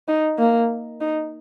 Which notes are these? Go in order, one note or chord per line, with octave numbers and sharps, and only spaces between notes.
D#4
A#3
D#4